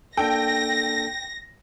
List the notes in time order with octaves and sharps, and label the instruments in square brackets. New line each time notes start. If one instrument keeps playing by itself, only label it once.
[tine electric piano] A#3 D4 A4 [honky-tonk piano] G5 [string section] A#6